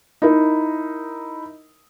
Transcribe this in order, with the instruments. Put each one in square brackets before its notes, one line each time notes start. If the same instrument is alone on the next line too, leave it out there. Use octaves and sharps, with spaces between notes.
[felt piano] D#4 E4 A#4